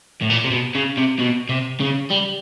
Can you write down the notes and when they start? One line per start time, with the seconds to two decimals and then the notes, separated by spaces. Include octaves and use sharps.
0.22 A2
0.30 A#2
0.45 C3
0.51 B2
0.75 C#3
0.98 C3
1.19 B2
1.49 C3
1.80 C#3
2.11 G3